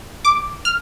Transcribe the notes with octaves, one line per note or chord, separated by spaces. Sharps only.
D6
F6